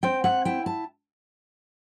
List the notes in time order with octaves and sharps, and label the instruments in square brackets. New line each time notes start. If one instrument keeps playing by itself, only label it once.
[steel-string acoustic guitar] C4 G5
F#5
E4 G5
A5